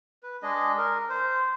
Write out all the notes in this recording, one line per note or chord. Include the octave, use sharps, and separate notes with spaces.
B4
G#3 D4 G#4 D#5
A#4
C5